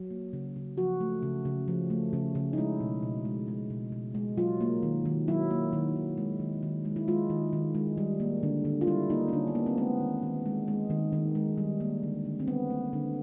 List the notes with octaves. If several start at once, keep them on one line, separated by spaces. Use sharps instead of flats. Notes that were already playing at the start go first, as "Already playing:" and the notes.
Already playing: F#3
A#3
C#3
C#3
F3 F#4
A3
C#3
C#3
F3
A3
C#3
C#3
D#4
G#3 E4
B2
B2
G#3
G#3
B2
B2
G#3
F#3 F4
A#3
D#3
D#3
F#3 E4
A#3
D#3
D#3
G#3
D#3
D#3
G#3
E4
G#3 F4
D#3
D#3
G#3
G3
A#3
D3
D3
F4
G3 E4
A#3 D#4
C#4
D3 D4
B3
D3 A#3
C4
G#3 B3
D#3
D#3
G#3
G#3
D#3
D#3
G#3
G3
A#3
D3
D3
C4
G3 B3
A#3
D3